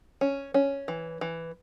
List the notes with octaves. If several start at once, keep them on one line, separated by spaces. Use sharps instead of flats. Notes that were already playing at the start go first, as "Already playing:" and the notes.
C#4
C#4
E3
E3